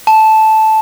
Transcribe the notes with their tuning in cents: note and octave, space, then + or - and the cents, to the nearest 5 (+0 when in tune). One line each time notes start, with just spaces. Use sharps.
A5 -10